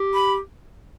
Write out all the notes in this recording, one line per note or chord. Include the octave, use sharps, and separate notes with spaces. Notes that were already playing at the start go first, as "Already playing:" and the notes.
Already playing: G4
B5